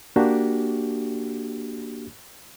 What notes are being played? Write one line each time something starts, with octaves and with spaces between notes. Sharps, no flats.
A#3 D4 F#4 G4